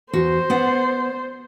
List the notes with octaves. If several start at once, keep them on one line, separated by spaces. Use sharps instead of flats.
E2 F#4 C5
B3 D5 F#5